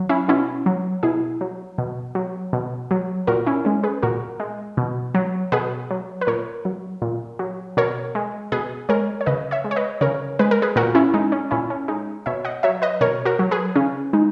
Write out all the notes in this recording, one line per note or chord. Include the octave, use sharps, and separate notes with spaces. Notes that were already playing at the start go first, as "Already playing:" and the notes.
Already playing: F#3
C#4 E4
B2 C#4 E4
F#3
B2 E4 G#4
F#3
B2
F#3
B2
F#3
A#2 F#4 A#4
C#4 E4
G#3 C#4
G#4 B4
A#2 F#4 A#4
G#3
B2
F#3
B2 G#4 B4
F#3
B4
A#2 A#4 C#5
F#3
A#2
F#3
B2 A#4 C#5
G#3
B2 G#4 B4
G#3 A#4 C#5
C#5
C#3 B4 D#5
C#5 E5
G#3
C#5
B4 D#5
C#3 A#4 C#5
G#3 B4
A#4
G#4 B4
A#2 F#4 A#4
C#4 E4
G#3 D#4
C#4
A#2 C#4 E4
C#4
G#3 D#4
B2 C#5 E5
D#5 F#5
F#3 C#5 E5
B4 D#5
B2 A#4 C#5
F#4 A#4
F#3
G#4 B4
C#3 C#4
G#3 D#4